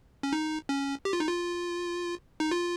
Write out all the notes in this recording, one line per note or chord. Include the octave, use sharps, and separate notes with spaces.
C#4
D#4
C#4
G4
F4
D#4
F4
D#4
F4